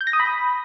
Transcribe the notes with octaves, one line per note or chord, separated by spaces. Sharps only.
G6
A#6
D#6
B5